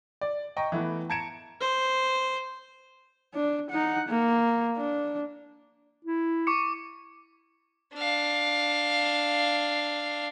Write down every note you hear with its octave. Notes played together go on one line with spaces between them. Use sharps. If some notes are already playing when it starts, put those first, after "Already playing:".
D5
D#5 G5 A#5 C#6
E3 A3 B3
A5 A#5 G#6 C#7 D7 E7
C5
D4
D#4 F#5
A#3
D4
E4
C#6 D6 C#7
D4 F5